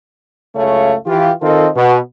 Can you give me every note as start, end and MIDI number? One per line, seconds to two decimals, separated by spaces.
0.56 0.95 37
0.56 0.95 42
0.56 0.95 49
0.56 0.95 57
0.56 0.95 73
0.56 0.95 77
1.07 1.31 52
1.07 1.31 65
1.07 1.31 67
1.42 1.68 51
1.42 1.68 60
1.42 1.68 65
1.42 1.68 69
1.42 1.68 70
1.42 1.68 75
1.76 1.97 47